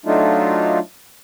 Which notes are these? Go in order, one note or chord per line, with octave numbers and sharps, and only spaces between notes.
F#3 A3 D4 D#4 F4